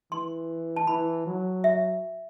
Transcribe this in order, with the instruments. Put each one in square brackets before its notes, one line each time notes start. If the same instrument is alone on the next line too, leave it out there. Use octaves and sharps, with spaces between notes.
[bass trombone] E3 [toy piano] C6
[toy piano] A5
[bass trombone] E3 [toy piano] B5
[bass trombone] F#3
[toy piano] E5